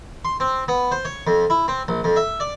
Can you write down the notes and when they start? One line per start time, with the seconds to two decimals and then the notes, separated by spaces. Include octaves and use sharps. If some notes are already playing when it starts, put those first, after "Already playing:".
0.25 C6
0.40 C4
0.68 B3
0.91 C5
1.05 C#5
1.27 F2
1.50 E4
1.68 C4
1.88 A#1
2.04 F2
2.16 E5
2.40 D5